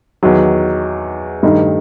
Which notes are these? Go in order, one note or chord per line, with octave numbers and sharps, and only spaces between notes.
E2 D#3 F#3
G2 D#3 A3 D#4